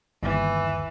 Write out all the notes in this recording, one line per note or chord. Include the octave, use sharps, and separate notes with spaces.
G1 D#2 E3